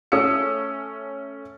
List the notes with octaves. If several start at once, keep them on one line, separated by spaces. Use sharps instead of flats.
A3 C#4 D#6 E6 C#7